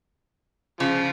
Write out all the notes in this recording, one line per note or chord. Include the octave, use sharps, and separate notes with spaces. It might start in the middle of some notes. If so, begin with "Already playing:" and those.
C#3 F3